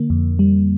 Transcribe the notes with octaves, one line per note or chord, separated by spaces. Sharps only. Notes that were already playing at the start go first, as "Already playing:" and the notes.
Already playing: D3 A#3
F2
G3